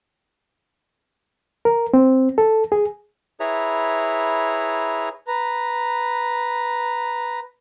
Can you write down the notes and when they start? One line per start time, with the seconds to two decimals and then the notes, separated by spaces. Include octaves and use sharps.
1.65 A#4
1.94 C4
2.38 A4
2.72 G#4
3.40 E4 G#4 B4 C#5 E5 A#5
5.28 B4 A#5